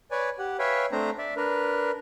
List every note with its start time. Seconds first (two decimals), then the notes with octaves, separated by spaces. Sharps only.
0.11 B4 C#5 D5 G#5
0.39 G4 F#5
0.59 B4 C#5 E5 F5 G5 G#5
0.92 A3 C4 D4 C5 A#5
1.18 D5 E5
1.37 D4 A#4 B4